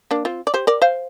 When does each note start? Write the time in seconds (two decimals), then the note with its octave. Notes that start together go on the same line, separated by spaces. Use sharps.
0.11 A#3 D4
0.25 C4 F4
0.47 D5
0.54 G4 C5
0.67 A#4 D5
0.82 C5 F5